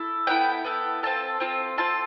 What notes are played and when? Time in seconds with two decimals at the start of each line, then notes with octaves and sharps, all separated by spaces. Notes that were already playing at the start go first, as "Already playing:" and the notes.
Already playing: E4 A4
0.27 B3 E4 A4 G5
0.65 B3 E4 A4
1.03 C4 F4 A4 A5
1.40 C4 F4 A4
1.77 C4 F4 A4 A5